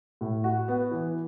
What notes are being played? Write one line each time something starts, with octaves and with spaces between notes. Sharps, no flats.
A2
F#4
B3
E3